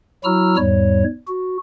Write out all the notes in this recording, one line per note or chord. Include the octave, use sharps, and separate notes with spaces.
F#3 E4 F#4 A#5 E6 F6
E2 G#2 G3 C#5
F#4